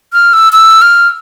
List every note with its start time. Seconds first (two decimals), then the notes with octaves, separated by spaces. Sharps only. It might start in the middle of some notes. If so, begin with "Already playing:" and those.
0.13 F6
0.33 E6
0.53 E6
0.82 F6